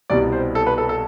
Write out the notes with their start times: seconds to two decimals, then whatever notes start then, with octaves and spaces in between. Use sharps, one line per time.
0.10 C2 B2 G3 D5
0.32 C5
0.55 A4
0.67 B4
0.78 A4
0.89 A4